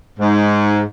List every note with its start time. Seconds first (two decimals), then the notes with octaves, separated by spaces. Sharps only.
0.18 G#2